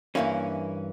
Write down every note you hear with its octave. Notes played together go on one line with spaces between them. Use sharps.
G2 E3 A#3 C#4